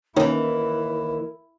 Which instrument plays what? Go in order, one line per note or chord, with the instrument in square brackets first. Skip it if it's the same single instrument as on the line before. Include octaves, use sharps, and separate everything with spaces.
[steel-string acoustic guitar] D#2 E3 [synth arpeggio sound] D#3 C#4 D#4 [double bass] E4 [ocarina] A#4